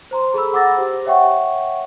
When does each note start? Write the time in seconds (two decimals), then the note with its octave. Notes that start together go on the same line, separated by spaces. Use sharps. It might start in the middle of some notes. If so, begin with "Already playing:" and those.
0.11 C5 A#5 C6
0.34 G#4 A4 A#5 B5 E6
0.53 F#5 D6 E6 A6 A#6
0.76 G4 C5
1.06 C#5 E5 F#5 G5 C#6